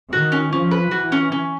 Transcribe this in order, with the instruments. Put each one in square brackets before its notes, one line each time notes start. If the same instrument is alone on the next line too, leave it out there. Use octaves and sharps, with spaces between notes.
[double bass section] D#3 [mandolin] F#4
[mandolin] C#4
[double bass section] F3 [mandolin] C#4
[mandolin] B4
[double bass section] E3 [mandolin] F#4
[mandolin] C#4
C#4